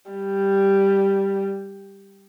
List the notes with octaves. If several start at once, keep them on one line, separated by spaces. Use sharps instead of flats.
G3